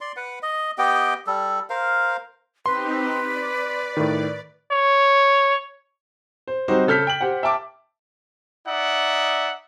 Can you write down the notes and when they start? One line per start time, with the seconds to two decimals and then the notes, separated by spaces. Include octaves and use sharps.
0.01 D5 C6
0.16 B4 F#5
0.43 D#5
0.78 B3 G4 D#5 G5
1.27 G3 A4
1.70 A#4 C5 F5
2.66 C4 D#4 G4 B4 C6
3.21 D5
3.97 A2 D#3
4.71 C#5
6.48 C5
6.68 G3 C4 D#4 F#4 C5
6.87 C#3 A4 F6 G6 B6
7.07 G5 F#7
7.21 G4 C5 F#5
7.43 E5 G5 A5 D6
8.67 D#4 D5 E5 F#5